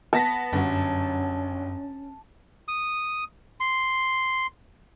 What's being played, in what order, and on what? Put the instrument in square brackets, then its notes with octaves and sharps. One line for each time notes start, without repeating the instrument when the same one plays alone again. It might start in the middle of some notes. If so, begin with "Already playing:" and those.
[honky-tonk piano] B3 A#6 B6 [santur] A5
[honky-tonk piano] G1 F#3 [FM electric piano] F#2 [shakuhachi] C#4
[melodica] D#6
C6